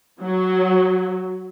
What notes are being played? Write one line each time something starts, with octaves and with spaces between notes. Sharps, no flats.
F#3